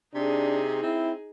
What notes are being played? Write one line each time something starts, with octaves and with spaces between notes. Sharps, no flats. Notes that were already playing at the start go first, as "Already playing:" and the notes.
C3 D4 D#4 G#4
C4 E4